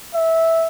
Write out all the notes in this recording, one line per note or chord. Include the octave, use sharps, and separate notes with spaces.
E5